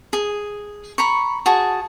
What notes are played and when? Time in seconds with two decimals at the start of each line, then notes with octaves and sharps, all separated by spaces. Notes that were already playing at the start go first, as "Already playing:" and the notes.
0.13 G#4
0.98 A#5 B5 C#6
1.46 F#4 G#4 A5